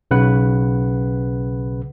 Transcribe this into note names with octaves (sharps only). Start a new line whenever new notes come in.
B1 C#3 B4 F#5